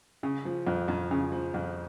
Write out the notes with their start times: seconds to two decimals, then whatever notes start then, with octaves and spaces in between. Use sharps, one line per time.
0.23 C#3
0.45 F3
0.67 F2
0.88 F2
1.11 C#3
1.32 F3
1.54 F2